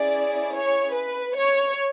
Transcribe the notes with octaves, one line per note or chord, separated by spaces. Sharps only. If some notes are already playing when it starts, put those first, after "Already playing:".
Already playing: C#4 E4 G#4 D5
C#5
B4
C#5